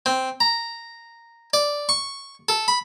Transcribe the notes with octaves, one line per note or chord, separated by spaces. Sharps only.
C4
A#5
D5
C#6
A4
B5